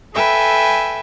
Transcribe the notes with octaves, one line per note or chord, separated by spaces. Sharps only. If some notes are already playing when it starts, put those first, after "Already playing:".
A4 B4 E5 G5 G#5